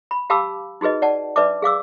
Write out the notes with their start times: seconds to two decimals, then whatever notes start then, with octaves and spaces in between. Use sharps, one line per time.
0.11 B5
0.30 G4 F5 A5 B5 D6 E6
0.81 D#4 F#4 G#4 B4 D#5
1.02 D5 F#5 A5
1.36 D4 B4 D5 E5 A5 D6
1.62 G#4 F5 D6 E6